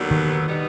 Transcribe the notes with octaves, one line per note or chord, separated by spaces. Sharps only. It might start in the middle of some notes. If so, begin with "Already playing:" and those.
Already playing: D#2 D3 F#3 B3
D#3
B2 G3 B3 D#4